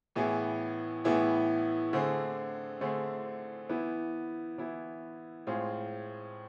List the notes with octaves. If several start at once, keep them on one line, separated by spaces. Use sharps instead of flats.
A2 E3 B3 E4 G#4
A2 E3 B3 E4 G#4
D3 A3 C4 G#4
D3 A3 C4 G#4
E3 B3 E4
E3 B3 E4
A2 G#3 C4 F4 G#4